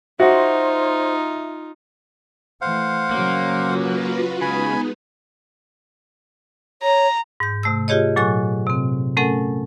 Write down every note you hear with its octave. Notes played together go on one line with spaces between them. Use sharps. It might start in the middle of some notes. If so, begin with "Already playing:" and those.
D#4 F4 F#4 C5 E5
E3 A3 C5 F5 F#5
C#3 F#3 A#3
F4 F#4 B4
C#3 G#3 B3 D#4 G#5 B5
C#5 A#5
G#2 G6
C3 A3 E6
F4 G4 G#4 C#5 D#5
A#2 F#3 A4 G#5 C#6 F#6
C3 C4
A3 C#4 A4 A#4 F#5 G#5